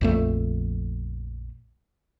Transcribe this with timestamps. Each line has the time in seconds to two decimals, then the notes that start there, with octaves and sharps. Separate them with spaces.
0.01 A#1 F2 A3